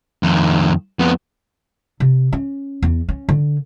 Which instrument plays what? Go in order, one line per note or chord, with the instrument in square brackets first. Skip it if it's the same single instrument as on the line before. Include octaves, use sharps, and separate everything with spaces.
[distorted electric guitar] F2 D#3
F2 B3
[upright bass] C3
C#4
E2
C#4
D3